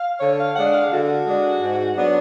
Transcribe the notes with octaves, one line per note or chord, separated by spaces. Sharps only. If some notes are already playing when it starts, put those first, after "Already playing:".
Already playing: F5
D3 C#5
F5
G#3 D4 F#5
F5
D3 F#4
G#3 D4
G#2
F#3 B3 D4